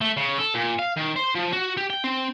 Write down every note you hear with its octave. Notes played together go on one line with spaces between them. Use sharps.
A3
C#3
A4
A#2
F5
D#3
C5
F3
F#4
G4
G5
C4